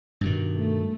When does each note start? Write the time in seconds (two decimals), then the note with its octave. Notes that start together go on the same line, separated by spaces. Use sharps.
0.21 G2 B2 D#3
0.52 A3